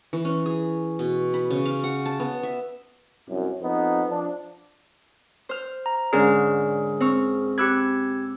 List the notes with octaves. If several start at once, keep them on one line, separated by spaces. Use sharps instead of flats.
E3
C#4
G#4
B2
B5
C#3
F5
F#5
A5
B3
E5
C2 F#2
F2 B3 D#4
F3 D4
C5 F6
A#5
G#2 D3 C#4 G#4 A#4
C4 C#6 F6
G4 B5 D6 E6 F#6 G#6